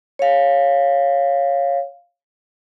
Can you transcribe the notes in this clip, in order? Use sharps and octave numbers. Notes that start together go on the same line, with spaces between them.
C#5 F5